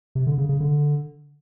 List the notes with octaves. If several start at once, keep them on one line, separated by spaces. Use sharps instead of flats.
C3
D3
C#3
C#3
D3